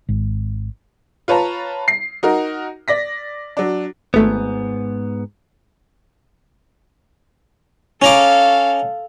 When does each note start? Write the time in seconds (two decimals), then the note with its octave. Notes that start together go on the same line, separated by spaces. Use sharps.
0.09 G#1
1.28 F4 B4 C#5 A5 A#5
1.88 C7
2.23 D#4 F#4 A#4
2.88 D5 A#6 B6
3.57 F#3 D4
4.14 G#1 G#2 A3 B3
8.02 C#4 A4 F5 A#5 D6